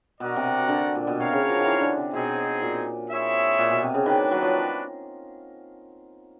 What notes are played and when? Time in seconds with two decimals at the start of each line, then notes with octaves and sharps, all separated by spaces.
0.20 B2 D4 F#4 A#4 D5 F#5
0.36 C3
0.68 D3
0.95 A#2
1.07 B2
1.16 C3 F#4 A#4 C#5 F5
1.33 C#3
1.49 F3
1.60 D#3
1.65 E3
1.81 D3
1.97 C3
2.13 B2 C4 D#4 G#4
2.62 A#2
3.09 C4 E4 G#4 C#5 E5
3.58 A#2
3.70 B2
3.82 C3
3.94 C#3
4.06 D#3 A#3 D4 F#4 B4
4.31 F#3
4.43 F3